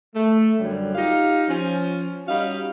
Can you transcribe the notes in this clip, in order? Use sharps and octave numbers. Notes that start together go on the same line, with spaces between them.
A3
F#2 D3 F#3 G3
D#4 F4 G4 F5
F3 C#4
G3 C#4 D#4 F#4 F5